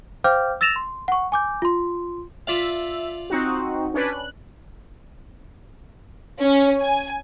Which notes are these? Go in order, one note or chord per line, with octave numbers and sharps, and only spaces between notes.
C5 F5 G5 D6 F6 G6
E6 A6 A#6 E7 F7
C6
F#5 C#6
G#5 D6 G6
F4 C6
F4 D5 E5 F5
C4 D#4 F#4
C#4 D4 B4
F#6
C#4
G#5